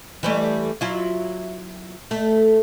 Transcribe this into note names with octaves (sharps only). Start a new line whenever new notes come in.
E3 G3 A3
F#3 E4 F4
A3